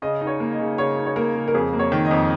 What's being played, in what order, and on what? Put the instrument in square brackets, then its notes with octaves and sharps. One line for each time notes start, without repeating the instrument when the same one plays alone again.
[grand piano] C#3 [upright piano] D#5
[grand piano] D#4
[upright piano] C#5
[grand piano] A#3
[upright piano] D#5
[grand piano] C#3
[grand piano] C#3 [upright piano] C#5
[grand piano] D#4
[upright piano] C#5
[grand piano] A#3 [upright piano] A#4
[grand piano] C#3
[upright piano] A#4
[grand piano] F2 [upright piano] G#4
[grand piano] A#3
[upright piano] C#5
[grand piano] D#3
[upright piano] D#5
[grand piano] F2